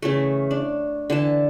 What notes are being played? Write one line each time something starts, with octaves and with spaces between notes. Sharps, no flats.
C#3 E3 A3
D4
D3 E3 A5